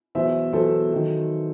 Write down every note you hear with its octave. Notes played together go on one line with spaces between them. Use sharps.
E2 B2 F#3 C5 E5
E2 B2 F#3 A4 C5
D#3 F#3